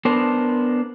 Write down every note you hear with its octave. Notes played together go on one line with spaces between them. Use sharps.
B3 D4 A#4 C5